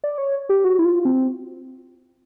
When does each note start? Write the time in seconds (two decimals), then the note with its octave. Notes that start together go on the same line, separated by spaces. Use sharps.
0.04 D5
0.18 C#5
0.49 G4
0.64 F#4
0.79 E4
0.85 F4
1.05 C4